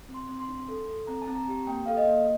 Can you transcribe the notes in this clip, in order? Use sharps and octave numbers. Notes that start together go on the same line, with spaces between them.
C4
C6
C4
C6
D4
A4
A4
C4 A#5
A5
C4
A#5
G4
A#3 G5
A4 F5
D#5
A#3